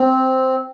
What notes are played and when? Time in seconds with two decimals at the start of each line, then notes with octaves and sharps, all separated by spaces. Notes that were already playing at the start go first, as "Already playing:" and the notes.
Already playing: C4